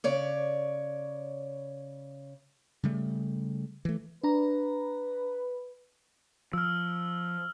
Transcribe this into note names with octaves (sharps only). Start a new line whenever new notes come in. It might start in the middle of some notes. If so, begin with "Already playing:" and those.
C#3 C#5 D5
C#3 G3 A3
E3 A3
D4 B4 A#5
F3 E6 F6